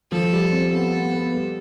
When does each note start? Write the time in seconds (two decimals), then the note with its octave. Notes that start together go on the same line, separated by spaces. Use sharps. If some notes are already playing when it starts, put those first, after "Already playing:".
0.12 F3 A4
0.32 G3
0.52 C4
0.73 B3 A4
0.93 B3
1.13 B3
1.33 G3